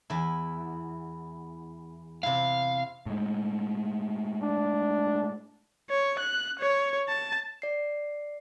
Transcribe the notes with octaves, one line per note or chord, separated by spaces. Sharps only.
E2 E4
C3 E4 F5
A2 G#3
D4
C#5
F#6
C#5
A5
D5 C7